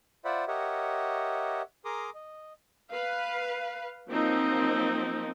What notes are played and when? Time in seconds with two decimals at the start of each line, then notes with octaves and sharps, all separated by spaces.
0.25 F4 C5 D5 E5 F#5 B5
0.48 G4 A#4 C#5 D#5 E5 F#5
1.85 G#4 A#4 A#5 C6 D6 D#6
2.15 D#5
2.91 B4 F5
4.09 F3 F#3 A#3 C4 D#4